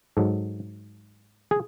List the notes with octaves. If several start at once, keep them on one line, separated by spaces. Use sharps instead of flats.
G#2 F#3 A4
G#4